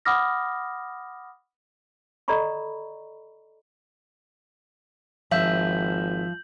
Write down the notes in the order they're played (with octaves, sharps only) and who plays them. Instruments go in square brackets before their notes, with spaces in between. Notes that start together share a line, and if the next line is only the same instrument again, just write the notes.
[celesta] F#5 B5 D6 D#6 F6 A#6
[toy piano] A4 D5 D#5 A#5 B5 C#6
[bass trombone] G#1 [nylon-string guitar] F3 [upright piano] E5 [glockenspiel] G6 F#7